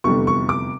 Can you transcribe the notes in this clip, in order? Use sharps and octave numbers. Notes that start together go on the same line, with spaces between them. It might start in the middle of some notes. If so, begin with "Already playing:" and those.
F1 E2 D3 G3 C#6
C#6
D6